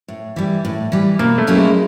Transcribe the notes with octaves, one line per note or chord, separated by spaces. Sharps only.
A2
E3 G3
A2
E3 G3
B2 A#3
A3
F#3 A#3 C#4 E4
G#3